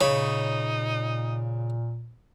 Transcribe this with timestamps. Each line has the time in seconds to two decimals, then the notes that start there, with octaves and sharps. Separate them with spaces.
0.01 A#2 C#3 D#4 C#5 B5